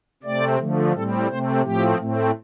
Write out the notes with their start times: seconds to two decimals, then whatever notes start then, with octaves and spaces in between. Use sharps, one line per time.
0.23 C3 A3 C4 D5
0.58 D3 F3 A3
0.92 A2 G3 C4 A4
1.28 C3 A3 C4 C5
1.62 A2 F3 A3 C4 G4
1.97 A2 A3 C4